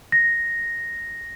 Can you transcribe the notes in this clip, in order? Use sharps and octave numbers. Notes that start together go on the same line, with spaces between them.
A#6